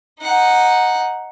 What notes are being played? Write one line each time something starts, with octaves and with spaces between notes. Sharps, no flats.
D#4 F#5